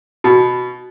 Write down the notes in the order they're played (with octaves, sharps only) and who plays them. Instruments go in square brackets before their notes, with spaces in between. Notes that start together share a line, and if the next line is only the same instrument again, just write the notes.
[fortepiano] B2